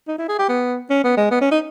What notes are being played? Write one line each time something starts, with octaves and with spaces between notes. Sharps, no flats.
D#4
E4
G#4
G4
B3
C#4
B3
G#3
B3
C#4
D#4